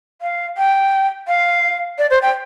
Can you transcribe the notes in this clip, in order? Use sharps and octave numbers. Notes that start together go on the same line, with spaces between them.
F5
G5
F5
D5
C5
G5